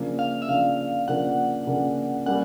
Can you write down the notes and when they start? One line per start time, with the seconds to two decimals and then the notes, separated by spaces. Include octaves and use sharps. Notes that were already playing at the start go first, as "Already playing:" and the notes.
Already playing: C#3 F3 A#3 D4
0.19 F5
0.42 E5
0.48 C#3 F3 A#3 D4 F5
1.08 C#3 F3 A#3 D4 F#5
1.67 C#3 F3 A#3 D4
2.26 G3 A#3 C#4 F#5